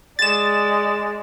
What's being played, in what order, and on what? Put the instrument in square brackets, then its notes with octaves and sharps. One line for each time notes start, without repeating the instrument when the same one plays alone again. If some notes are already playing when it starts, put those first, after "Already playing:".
[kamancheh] G#3 D5 [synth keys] A6 E7